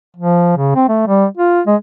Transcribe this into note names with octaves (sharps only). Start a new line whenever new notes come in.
F3
C#3
C4
A3
G3
F4
G#3